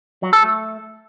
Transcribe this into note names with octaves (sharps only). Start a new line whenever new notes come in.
F#3
A4
A3